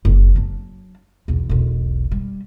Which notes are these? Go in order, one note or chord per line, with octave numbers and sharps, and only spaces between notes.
F#1
F#3 D4
B1 E2
E1 B1
G3